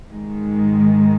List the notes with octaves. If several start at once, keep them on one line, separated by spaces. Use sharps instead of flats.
G#2 D#3 G#3